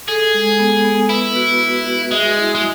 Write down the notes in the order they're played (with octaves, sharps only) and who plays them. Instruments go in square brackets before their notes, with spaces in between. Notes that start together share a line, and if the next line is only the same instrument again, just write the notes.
[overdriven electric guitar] G#4 [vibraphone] A4
[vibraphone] G#3
B3
B3
[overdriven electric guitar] E4 [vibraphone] B4
[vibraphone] F#4
F#4
F#4
[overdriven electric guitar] G#3 [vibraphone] E5
[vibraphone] E4
[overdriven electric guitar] G#3